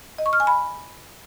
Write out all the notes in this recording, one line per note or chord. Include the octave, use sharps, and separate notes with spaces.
D#5
C#6
F6
G#5
B5